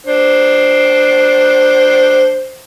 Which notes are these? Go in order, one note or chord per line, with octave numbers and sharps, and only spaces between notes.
D4 C5